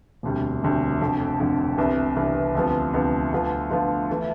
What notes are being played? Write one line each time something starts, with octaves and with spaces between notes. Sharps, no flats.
E1 D2 C3 G3
E1 D2 C3 G3
F1 F2 D3
F1 F2 D3
C2 C3 E3 B3 D4
C2 C3 E3 B3 D4
D2 C3 F3 B3
D2 C3 F3 B3
D2 D3 F3 B3 F4
D2 D3 F3 B3 F4
E3 A3